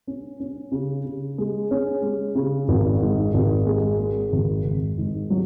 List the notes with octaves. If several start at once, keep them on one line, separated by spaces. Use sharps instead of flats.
C#4
C#4
C#3
C#3
G#3
C#4
G#3
C#3
G#1
G#2
G#1
G#3
G#3
G#1
G#1
G#2
F#3